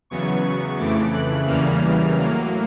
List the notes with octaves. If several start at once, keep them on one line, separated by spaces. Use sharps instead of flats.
E2 C#3 F#3 B3 C#6
F2 C#3 E3 A3 D6
F#6
E2 C#3 E3 G3 A#3 F6
A2 F#3 A#3